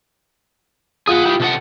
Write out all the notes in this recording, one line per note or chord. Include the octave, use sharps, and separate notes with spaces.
F4 G#4 F#5 D#6
E4 G4
C3 A4 F#5